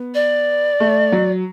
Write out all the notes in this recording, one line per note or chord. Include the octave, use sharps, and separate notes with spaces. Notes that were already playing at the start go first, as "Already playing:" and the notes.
Already playing: B3
D5
A3
F#3